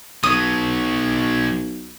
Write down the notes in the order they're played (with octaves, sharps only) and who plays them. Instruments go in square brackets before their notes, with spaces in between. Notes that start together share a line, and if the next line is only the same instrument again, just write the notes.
[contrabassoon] B1 [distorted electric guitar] B2 F#3 [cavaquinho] D#6